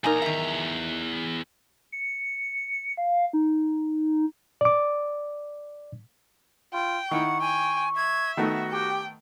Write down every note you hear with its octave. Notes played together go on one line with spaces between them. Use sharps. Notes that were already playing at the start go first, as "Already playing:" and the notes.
E2 A#2 D#4 A#4 G#5 A#5
D#3 E5
C#7
F5
D#4
D5 D6
F4 G5
D#3 E4 F#5 C#6
G5 G#5
E5 G#6
D#3 A3 B3 F#4
G4 G5